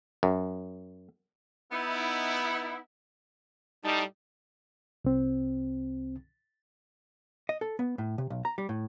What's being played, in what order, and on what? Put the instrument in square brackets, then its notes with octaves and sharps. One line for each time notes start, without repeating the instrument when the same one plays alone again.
[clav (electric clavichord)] F#2
[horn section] B3 D#4 E4
[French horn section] A2 G3 [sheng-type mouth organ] D#4 A5
[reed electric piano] C2 C4
[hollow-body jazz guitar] D#5
A4
B3
A2
C3
B1
A#5
G3
A2